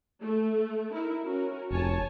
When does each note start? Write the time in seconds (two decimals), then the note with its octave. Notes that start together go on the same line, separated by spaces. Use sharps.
0.21 A3
0.92 D#4 E4 A#4
1.24 C#4 F#4 A#4
1.71 F1 C#5 G#5 A5